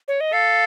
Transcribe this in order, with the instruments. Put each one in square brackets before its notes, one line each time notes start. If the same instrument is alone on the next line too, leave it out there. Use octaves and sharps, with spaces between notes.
[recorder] C#5
D#5
[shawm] A4 [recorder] F5